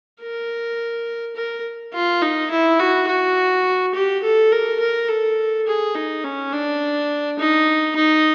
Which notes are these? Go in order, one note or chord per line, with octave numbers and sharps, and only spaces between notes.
A#4
A#4
F4
D#4
E4
F#4
F#4
G4
A4
A#4
A#4
A4
G#4
D#4
C#4
D4
D#4
D#4